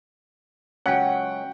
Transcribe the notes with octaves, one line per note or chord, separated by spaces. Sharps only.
C#2 F#3 C#4 F#5 G5